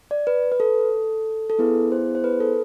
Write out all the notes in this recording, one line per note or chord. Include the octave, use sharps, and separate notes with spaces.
D5
B4
B4
A4
A4
B3 E4 G#4 B4
C5
C5
B4
A4